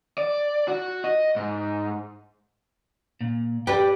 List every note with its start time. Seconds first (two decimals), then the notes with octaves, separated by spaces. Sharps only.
0.18 D5
0.68 F#4
1.04 D#5
1.36 G#2
3.21 A#2
3.67 G4 B4 D5 G5